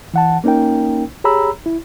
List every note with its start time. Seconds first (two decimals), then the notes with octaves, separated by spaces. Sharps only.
0.14 E3 F#5 A5
0.44 A#3 C#4 D#4 A#4 G5
1.24 G4 G#4 C#5 A#5 B5 E6
1.66 E4